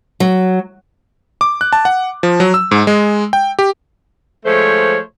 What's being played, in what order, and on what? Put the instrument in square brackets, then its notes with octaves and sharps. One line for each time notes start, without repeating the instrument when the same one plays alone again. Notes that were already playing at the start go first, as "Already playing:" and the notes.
[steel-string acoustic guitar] F#3
[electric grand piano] D6
F#6
A5
F#5
F3
F#3
E6
G#2
G#3
G5
G4
[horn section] F3 G#3 A3 C5 C#5